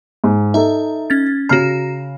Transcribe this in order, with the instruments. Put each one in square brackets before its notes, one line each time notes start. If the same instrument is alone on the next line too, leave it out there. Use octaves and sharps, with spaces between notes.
[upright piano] G#2
[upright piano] D#4 A4 [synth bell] E5 A#5
[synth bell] C#4 G#6 A6
[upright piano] C#3 F6 C7 [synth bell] F#4 A#5